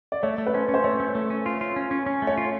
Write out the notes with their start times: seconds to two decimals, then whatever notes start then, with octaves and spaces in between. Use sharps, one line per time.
0.12 D5
0.23 A3 C#5
0.38 A3
0.47 B4
0.54 C#4 C5
0.68 C#4
0.74 C5
0.84 A3 C#5
1.00 A3
1.15 A3
1.30 C#4
1.46 F4
1.61 F4
1.76 C#4
1.91 C#4
2.06 C#4
2.22 A3
2.27 C#5
2.37 F4